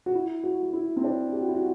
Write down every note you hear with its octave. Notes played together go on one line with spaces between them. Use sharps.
F#4
E4
F#4
F#4
E4
C4
D4
G4
F#4
E4
F#4